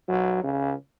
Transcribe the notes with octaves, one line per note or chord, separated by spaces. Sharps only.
F#3
C#3